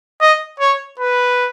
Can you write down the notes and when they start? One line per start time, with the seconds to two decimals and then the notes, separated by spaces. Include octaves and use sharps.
0.21 D#5
0.60 C#5
0.99 B4